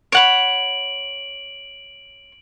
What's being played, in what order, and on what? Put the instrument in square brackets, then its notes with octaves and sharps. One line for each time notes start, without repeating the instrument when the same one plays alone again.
[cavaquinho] C#5 F#5 B5 [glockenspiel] D7 F#7